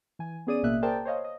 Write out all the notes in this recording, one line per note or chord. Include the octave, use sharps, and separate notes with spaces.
E3 G#5
B3 C#4 G#4 D5 D#6 D#7
A1 B2 A#3 E5 F#6
G#4 A#4 C5 D5 G5 A5
C5 C#5 D#5 F5
D#5